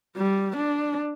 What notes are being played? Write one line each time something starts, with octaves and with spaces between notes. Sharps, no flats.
G3
D4